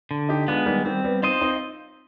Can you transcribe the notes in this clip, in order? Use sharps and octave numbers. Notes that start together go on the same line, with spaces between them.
D3
D#4 G4
G#3 B3 D4 F4
D#3 G3
D#3 G3 C4
G3 B3
C4 D#4 F4 C5 D#5
C4 D#4